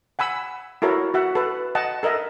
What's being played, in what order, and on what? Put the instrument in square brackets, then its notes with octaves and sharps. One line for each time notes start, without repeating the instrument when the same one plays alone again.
[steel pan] F#5 G#5 B5 E6
E4 F#4 A4 A#4 C#5
F#4 E5 F#5
A4 B4
D#5 F#5 A5
A4 A#4 D#5 E5